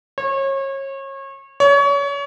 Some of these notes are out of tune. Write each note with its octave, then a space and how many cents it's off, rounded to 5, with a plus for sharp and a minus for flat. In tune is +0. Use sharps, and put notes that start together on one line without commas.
C#5 -30
C#5 +30